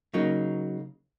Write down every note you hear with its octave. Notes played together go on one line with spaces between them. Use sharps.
C#3 F#3 A#3 D#4